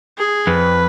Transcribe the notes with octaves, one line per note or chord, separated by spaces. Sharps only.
G#4
F2 B4